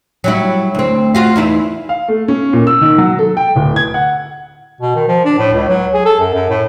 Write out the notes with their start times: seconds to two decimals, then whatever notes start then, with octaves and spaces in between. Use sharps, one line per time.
0.24 F#3 G3 E4
0.75 D2 C4
1.15 F4 F#4 F5
1.36 E2 D#4 E4
1.89 F5
2.08 A3
2.28 C#4
2.53 A#2
2.67 E6
2.81 D#3
2.98 F#3
3.19 A4
3.37 G5
3.56 D1
3.76 G#6
3.94 F#5
4.81 B2
4.96 D#3
5.08 F3
5.25 D4
5.38 A2
5.53 C#2
5.69 F#3
5.94 G#4
6.05 A4
6.20 F#2
6.33 F#2
6.49 A2